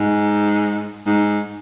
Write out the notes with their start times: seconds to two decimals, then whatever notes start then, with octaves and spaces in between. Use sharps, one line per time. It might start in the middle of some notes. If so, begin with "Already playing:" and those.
Already playing: G#2
1.06 G#2